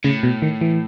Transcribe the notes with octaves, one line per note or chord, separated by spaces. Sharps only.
A2 C#3
B2
D#3
E3